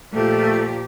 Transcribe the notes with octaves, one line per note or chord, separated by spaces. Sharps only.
A#2 F3 A3 G4